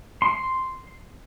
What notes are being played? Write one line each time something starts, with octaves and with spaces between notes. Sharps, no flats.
C6